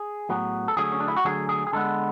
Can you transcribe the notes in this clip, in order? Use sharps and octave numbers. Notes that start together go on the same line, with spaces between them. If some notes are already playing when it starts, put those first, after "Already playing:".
Already playing: G#4
A2 F#3 B3
A4
D3 F#3 A3 G#4
C#4
D4
E4
F#4
D3 F#3 A3 G#4
G#4
G#4
D3 G#3 B3 A4